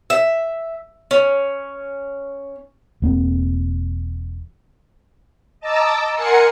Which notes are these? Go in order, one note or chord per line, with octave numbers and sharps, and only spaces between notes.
E5
C#4
E1 A#3 C4
D#5 A5 A#5 D6 E6
A#4 F#5 G#5 C6 C#7